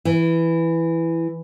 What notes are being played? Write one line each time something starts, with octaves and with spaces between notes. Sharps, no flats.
E3